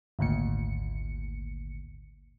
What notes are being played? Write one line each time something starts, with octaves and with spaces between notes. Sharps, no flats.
G#1 D2 A#2 C#7